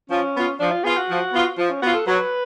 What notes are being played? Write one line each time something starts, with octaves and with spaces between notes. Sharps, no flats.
F3 C#4
B3 F4
F3 D4
F4
B3 F4 G#4
F#4
F3
B3 F4
F3 F4
C#4
B3 F4 F#4
A4
F#3 B4